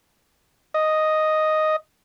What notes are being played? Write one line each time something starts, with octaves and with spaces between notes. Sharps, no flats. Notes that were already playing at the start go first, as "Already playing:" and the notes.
D#5